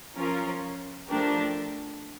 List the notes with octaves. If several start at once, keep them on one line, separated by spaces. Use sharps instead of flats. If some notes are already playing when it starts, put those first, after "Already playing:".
F3 C#4 F4 A#4
F3 A3 D4 G4 A#4